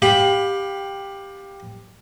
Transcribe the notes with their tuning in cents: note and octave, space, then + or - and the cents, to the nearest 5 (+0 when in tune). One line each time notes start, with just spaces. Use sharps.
G4 +10 F5 +30 B5 +5